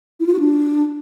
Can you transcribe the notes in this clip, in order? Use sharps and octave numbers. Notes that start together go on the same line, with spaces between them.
E4
F4
F#4
D4